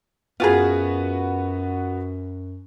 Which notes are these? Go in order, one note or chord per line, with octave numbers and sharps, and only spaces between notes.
F#2 B3 F4 F#4 G#4 B4